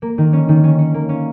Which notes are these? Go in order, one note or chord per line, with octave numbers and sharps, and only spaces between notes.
A#3
D#3
C#4
D#3
C#4
C#4
A#3
C#4